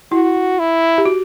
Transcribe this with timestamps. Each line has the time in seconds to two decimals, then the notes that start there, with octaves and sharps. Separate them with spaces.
0.12 E4 F#4
0.59 E4
0.98 G4
1.05 F#4